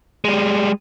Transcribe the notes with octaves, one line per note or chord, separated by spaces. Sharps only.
G3 G#3